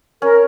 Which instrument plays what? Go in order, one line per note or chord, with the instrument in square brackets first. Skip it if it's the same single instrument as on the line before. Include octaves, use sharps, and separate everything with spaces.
[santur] C#4 [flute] A#4